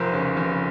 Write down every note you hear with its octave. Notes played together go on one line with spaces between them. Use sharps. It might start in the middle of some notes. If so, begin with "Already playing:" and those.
Already playing: F1 F2 A#4 C5
C#3
F1